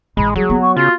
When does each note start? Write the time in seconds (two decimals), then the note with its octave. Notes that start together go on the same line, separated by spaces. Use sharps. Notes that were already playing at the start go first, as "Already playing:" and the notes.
0.17 A1 G#3 B5
0.36 F#3 G3 G#4
0.50 B3
0.61 C#6
0.76 C#3 F4 F#4